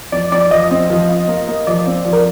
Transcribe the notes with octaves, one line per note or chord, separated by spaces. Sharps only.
F2 D5
F2 D5
F3 D#5
C4
F3
F4
A#3
A#3
F3 D5
C4
F3
A#4